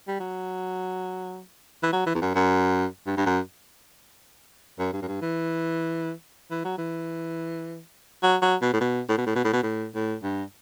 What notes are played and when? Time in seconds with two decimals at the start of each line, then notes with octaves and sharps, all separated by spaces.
0.08 G3
0.20 F#3
1.83 E3
1.93 F#3
2.07 E3
2.15 E2
2.21 F#2
2.35 F#2
3.07 G2
3.17 G2
3.26 F#2
4.79 F#2
4.93 G2
5.02 F#2
5.08 G2
5.22 E3
6.51 E3
6.65 F#3
6.78 E3
8.23 F#3
8.42 F#3
8.62 B2
8.73 A2
8.81 B2
9.09 A2
9.18 B2
9.26 A2
9.36 B2
9.45 A2
9.53 B2
9.63 A2
9.95 A2
10.23 G2